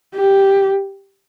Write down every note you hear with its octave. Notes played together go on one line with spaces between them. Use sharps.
G4